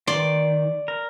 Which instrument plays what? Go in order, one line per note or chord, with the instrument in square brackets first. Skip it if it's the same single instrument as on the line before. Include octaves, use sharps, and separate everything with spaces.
[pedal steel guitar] D#3 [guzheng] D5 C6
[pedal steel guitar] A#4